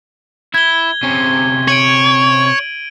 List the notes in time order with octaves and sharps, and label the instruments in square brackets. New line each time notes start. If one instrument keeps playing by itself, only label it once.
[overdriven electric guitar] E4 [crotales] G#6 G7
[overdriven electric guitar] C3 C#4
[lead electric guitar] C#5 [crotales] D7 D#7 F#7